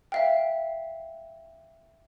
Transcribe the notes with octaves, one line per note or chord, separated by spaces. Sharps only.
E5 F5 G5